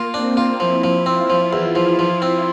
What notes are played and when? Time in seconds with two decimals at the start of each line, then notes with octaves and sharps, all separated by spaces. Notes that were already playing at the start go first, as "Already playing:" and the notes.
Already playing: A#3 F4
0.14 C4 D4
0.37 F4
0.60 F3 E4
0.84 F3
1.06 C4 F4
1.30 F3
1.53 E2
1.75 F3
1.99 F3
2.22 C4